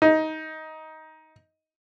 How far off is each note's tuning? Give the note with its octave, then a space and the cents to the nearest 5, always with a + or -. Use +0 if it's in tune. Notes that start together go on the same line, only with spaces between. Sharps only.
D#4 +15